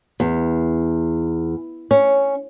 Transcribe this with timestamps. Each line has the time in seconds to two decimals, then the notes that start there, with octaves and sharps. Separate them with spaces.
0.20 E2
1.91 C#4